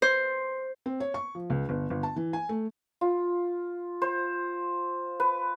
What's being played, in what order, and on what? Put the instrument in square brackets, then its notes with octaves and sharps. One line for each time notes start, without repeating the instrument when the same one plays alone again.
[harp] C5
[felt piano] C4
C#5
C#6
F3
C#2
G1
G1
A5
E3
G#5
A3
[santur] F4
C5
B4